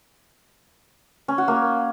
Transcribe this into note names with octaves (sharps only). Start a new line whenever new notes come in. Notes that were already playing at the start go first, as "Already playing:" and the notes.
C#4
F#4
A#3